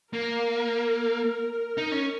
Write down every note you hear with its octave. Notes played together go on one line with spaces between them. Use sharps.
A#3 A#4
D#4
C#4